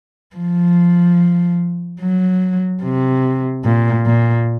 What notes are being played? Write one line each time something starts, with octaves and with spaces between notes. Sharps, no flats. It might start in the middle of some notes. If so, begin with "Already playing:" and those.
F3
F#3
C3
A#2
A#2